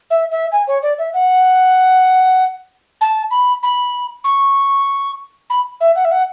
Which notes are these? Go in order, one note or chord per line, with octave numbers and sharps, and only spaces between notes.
E5
E5
G#5
C#5
D5
E5
F#5
A5
B5
B5
C#6
B5
E5
F#5
E5
F#5